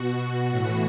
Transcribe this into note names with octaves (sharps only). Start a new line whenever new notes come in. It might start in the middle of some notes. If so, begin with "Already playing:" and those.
Already playing: B2 F#4
A2 E3